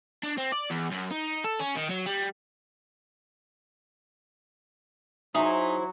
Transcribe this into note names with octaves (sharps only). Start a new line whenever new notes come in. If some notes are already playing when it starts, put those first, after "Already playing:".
D4
C4
D5
E2
F#2
D#4
A4
C#4
D#3
F#3
G3
F#3 D#4 E4 G#4 C5